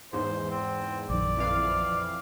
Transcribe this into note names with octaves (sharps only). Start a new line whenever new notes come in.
E2 G#2 C5
C4
A#1 F#2 D#3 D5
F2 E3 F5